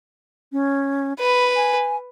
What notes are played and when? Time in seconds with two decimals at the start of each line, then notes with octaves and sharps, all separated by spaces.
0.53 C#4
1.19 B4 B5
1.56 G#5